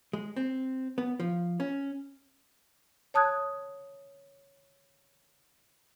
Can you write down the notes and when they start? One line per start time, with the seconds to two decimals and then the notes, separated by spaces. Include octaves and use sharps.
0.13 G#3
0.36 C4
0.98 B3
1.20 F3
1.60 C#4
3.14 C#5 A5 D#6 F#6 G#6